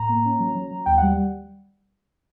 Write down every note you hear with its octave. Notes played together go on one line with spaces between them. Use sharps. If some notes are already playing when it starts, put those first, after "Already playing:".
Already playing: A2 A#5
A#3
C#4
F#3
F#3
F#3
D#2 G5
G3 F#5